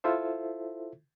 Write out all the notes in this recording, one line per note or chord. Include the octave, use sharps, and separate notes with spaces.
E4 F4 A4 C5 E5